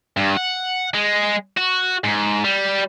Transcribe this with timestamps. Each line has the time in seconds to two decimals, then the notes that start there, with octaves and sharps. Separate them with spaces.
0.17 G2
0.37 F#5
0.94 G#3
1.57 F#4
2.04 G#2
2.44 G3